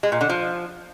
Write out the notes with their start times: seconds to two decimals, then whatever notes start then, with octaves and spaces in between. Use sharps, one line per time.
0.03 G#3
0.12 A#2
0.21 D3
0.29 F3